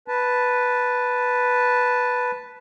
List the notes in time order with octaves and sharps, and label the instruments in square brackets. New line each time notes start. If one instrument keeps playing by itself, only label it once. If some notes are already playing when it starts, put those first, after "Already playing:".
[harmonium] B4 A5